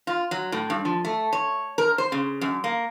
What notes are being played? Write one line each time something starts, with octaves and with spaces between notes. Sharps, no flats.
F4
F#3
A2
G2
F3
A3
C#5
A#4
C5
C#3
F#2
A#3